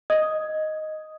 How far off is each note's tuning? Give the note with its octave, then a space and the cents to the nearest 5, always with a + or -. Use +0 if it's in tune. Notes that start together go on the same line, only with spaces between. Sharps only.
D#5 +0 D#6 +0